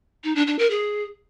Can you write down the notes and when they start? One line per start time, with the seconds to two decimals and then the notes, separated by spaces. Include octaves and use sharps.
0.24 D#4
0.35 D4
0.47 D4
0.59 A#4
0.70 G#4